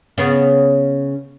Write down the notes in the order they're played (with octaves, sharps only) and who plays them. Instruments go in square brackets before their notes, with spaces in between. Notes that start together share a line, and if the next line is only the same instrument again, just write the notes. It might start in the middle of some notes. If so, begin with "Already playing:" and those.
[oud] C#3 B3